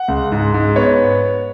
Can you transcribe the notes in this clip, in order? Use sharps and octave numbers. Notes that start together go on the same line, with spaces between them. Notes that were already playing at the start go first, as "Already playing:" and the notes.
Already playing: F#5
C#2
G#2
G#2
B3 C#5